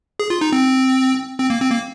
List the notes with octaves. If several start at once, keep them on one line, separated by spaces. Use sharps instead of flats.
G#4
F4
D#4
C4
C4
A#3
C4
A#3